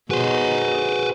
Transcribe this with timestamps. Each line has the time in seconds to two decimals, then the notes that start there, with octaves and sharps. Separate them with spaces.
0.11 B2 D#4 F#4 G#4 B4 C5